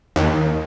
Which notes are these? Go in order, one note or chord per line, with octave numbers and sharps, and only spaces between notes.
D#2